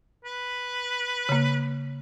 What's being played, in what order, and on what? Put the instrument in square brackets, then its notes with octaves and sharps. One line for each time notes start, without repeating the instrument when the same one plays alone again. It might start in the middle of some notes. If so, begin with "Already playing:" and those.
[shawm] B4
[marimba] C#3 A#3